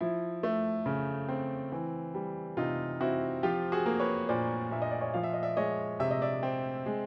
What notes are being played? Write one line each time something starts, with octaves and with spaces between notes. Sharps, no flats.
F3 E4
A3
C#3
C4
E3
G3
C3 D#4 F4
C4 E4 F#4
F3 F4 G4
F#4 G#4
A#3
B4 C#5
A#2 C5 D5
A#2 E5
D#5
D5
C#5 D#5
F3 F5
E5
D#5
D5 E5
G#3 C#5 D#5
C3 E5
D#5
D5 E5
C4
G#3